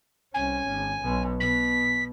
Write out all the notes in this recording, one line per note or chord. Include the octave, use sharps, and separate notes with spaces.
C2 C#4 G#5
G#1
B1 B2
B2 B6